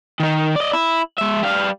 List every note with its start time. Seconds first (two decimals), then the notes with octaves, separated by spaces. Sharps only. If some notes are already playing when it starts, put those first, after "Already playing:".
0.20 D#3 D#4
0.56 D5 D#5
0.73 E4
1.19 G#3 E5
1.43 G3 F5